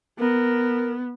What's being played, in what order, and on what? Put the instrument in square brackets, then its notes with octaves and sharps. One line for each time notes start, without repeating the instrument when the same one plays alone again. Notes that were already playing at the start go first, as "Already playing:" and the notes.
[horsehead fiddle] B3 [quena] A#4